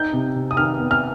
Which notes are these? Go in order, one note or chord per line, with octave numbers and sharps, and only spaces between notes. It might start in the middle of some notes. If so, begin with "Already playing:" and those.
Already playing: D#4 G6
C3
C3
D#6
D#3 F6
B3
F6